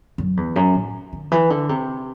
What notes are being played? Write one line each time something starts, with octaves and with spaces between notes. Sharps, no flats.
F#2
E2
F#2
A2
D3
E3
D3
C3